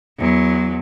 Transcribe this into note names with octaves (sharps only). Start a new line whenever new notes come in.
E2 F#3